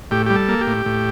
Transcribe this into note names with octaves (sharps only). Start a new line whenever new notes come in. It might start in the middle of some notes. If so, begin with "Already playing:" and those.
A2 G4
G3 G4
A4
A#3
G4
A2
A2